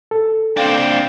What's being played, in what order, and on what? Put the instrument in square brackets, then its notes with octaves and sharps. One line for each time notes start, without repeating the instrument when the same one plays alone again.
[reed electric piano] A4
[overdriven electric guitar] C4 D4 [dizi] F5 [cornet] G5